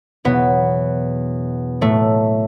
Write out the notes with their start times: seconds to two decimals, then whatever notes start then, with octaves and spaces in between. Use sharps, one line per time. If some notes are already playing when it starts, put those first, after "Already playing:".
0.25 E2 B2 F#3 B3
1.81 A2 F#3 A3